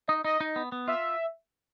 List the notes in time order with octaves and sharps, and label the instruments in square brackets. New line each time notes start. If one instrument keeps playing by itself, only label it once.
[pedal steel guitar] D#4 [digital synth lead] D#5
[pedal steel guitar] D#4 [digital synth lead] D#5
[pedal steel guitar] D#4
B3
B3
[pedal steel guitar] F4 [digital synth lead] E5